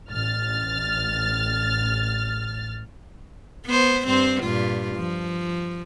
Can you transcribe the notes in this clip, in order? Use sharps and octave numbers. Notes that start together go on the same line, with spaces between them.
A1 F6 A6
B3 C5
G2 C4 C5
G2 A#2 F4
F3